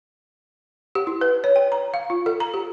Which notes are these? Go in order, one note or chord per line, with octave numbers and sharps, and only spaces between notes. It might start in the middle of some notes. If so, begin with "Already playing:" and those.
G4
E4
B4
C#5
G5
A#5
F5
F4
A4
A#5
G4